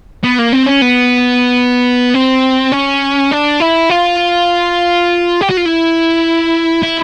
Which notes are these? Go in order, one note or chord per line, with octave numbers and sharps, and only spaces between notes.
B3
A#3
C4
C#4
B3
C4
C#4
D4
E4
F4
G4
F#4
F4
E4
E4